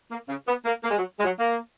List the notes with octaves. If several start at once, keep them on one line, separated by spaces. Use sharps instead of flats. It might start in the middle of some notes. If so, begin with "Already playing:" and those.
A#3
C#3
B3
A#3
A#3
G#3
F#3
G#3
F#3
A#3